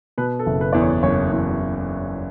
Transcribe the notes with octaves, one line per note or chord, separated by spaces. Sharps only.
B2 B4
A4
F#1
B4
E2 D5
C#5
F#1 C#5
E2